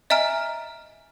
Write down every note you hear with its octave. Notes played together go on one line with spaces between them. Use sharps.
D#5 E5 G#5 A#5 F6 D7